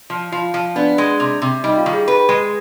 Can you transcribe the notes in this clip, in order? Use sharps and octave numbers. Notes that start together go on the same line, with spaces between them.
F3
F3 F4 F5
F3
B3 D4 D5
G#3
C3
C3
G3 D#4 D#5
F4 F5
D#3
G#4
G#4 B4
G#3